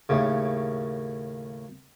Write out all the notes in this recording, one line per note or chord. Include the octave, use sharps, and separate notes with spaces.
D#2 A2 C#3